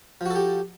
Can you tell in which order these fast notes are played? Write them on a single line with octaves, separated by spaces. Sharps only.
F3 F#4 A4 G4